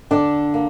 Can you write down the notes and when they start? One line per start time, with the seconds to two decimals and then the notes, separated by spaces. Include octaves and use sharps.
0.11 D3 D4
0.54 A#3